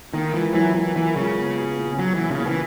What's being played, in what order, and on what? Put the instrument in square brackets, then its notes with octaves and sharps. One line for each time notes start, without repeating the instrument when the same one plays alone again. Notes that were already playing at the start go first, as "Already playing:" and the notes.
[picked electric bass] D#3 [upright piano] A#3
[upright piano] C#2 [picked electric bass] E3
[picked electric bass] E3 [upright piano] F#3
[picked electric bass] E3 [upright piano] A#3
[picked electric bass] E3 [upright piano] A#3
[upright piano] C#2 [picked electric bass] C#3
[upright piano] B3
F#4
A#2
[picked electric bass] F#3 [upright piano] F#4
[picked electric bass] E3
[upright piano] A#2
[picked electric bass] C#3
[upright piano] A#2
[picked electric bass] E3